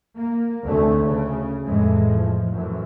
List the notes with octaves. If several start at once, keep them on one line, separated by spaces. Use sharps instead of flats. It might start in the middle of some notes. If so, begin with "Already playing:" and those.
A#3
D2 C3 A3 C#4
C#3
F2 A2 E3 G#3
F3
F#2 A2 E3